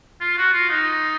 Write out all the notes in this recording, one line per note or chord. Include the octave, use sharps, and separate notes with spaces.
F4
F#4
F4
D#4